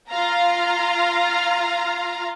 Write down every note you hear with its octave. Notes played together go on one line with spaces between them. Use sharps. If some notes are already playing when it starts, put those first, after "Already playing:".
F4 F5 A#5